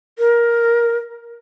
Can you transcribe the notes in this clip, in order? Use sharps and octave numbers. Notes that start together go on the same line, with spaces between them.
A#4